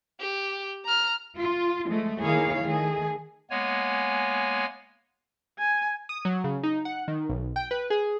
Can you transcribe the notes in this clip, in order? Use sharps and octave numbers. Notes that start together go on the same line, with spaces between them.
G4
A#5 F6
F4
F3 G#3 A3
D#3 A#3 E4 G#4 C#5 F5
D#3 A3 G#4
G#3 A#3 B3 C#5 G#5
G#5
D#6
F#3
C#3
D#4
F#5
D#3
B1
G5
B4
G#4